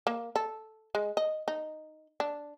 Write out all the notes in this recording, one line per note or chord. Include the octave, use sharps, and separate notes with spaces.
A#3
A4
G#3
D#5
D#4
D4